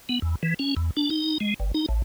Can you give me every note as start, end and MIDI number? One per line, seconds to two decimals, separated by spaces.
0.09 0.19 59
0.22 0.35 40
0.43 0.54 52
0.59 0.75 61
0.77 0.91 40
0.97 1.10 62
1.10 1.38 63
1.40 1.54 56
1.60 1.72 31
1.74 1.86 63
1.89 2.02 33